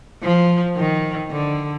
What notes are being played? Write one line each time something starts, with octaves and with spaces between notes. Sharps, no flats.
F3
D#3
D3